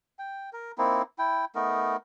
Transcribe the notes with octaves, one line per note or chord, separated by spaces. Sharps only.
G5
A#4
A#3 C4 D#4 E4
E4 G5
A3 B3 D#4 A#4